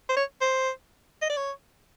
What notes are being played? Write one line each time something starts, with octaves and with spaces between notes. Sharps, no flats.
C5
C#5
C5
D#5
D5
C#5